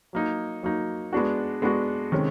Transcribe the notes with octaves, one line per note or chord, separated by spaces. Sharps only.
F#3 A#3 D#4
F#3 A#3 D#4
G#3 B3 D4 F#4
G#3 B3 D4 F#4
C3 D#3 G#3 C#4